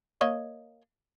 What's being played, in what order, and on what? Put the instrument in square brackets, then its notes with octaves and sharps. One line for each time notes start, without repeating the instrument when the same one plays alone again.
[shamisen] A#3 C#5 D#5